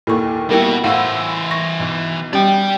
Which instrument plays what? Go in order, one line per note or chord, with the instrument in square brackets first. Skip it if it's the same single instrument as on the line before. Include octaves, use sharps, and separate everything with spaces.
[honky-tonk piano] D#2 A#2 [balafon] E4 A4 C#6
[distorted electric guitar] B2 F#4 [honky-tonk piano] G3 A#3 E4 [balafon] A#4 G5
[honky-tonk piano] A2 E4 E6 [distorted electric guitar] E3 C5 [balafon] F5 F#5
[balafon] C#6 [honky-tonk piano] A#6
[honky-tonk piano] B1
[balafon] G3 C#4 G4 [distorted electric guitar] D5 G5